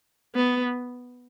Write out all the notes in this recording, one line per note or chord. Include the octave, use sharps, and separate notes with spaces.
B3